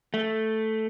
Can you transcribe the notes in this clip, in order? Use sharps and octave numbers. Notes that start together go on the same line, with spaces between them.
A3